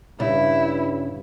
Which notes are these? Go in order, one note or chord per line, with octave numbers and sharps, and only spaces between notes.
G2 C#3 E4